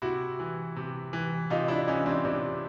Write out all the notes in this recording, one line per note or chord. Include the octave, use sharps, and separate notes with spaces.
C3 E4 F#4
E3
C3
E3
C3 D#4 F4
D4 E4
E3 C#4 D#4
C4 D4
C3 C4 D4